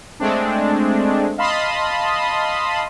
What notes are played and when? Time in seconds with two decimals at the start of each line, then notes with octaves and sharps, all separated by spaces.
0.20 G#3 A3 C4 D4
1.38 D#5 F5 A5 B5 C6 D#6